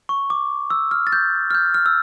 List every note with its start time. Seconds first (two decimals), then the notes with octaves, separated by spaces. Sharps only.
0.09 C#6
0.30 D6
0.70 E6
0.91 F6
1.07 A6
1.12 G6
1.51 F6
1.55 G6
1.74 F6
1.86 E6